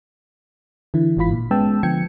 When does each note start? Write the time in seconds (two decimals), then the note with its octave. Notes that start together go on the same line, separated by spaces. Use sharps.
0.94 D3 E3 E4
1.17 G1 G#2 E3 F4 B5 B6
1.31 A#2
1.51 G#3 B3 C#4 G5 A5 E6
1.83 D3 F3 B3 G5 G#6 C#7